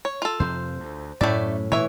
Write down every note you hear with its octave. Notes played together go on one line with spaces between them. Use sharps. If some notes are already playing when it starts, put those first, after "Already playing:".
C#5
F4 A4
F2 C3 F3 C5
D2
F#2 A2 A3 C#4 D5 E5
A#2 E3 C#5 E5